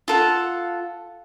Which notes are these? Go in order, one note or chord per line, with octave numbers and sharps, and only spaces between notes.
F4 A4 F#5